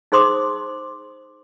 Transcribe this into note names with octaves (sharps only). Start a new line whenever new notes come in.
D#4 G#4 C5 C6 D6 D#6